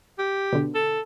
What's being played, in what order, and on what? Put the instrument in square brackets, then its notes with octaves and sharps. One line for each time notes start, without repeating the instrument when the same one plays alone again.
[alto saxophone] G4
[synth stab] B2 D3
[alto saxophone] A4